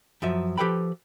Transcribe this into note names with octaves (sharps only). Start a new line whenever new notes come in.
F#2 F3 E5
F3 G4 A4 B4 G5 B5